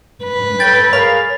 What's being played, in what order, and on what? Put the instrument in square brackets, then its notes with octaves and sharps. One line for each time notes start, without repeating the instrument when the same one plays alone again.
[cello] B4
[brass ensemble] A4 C#5 G5 [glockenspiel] A6
[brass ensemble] G#4 A#4 F5 [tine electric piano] C#5 [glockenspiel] B5